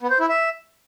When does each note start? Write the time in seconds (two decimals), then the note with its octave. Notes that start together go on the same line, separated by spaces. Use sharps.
0.01 B3
0.10 C5
0.20 E4
0.29 E5